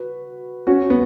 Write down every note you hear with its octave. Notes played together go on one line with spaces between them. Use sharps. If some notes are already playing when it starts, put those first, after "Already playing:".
Already playing: F#4 B4
C#4 F#4
B3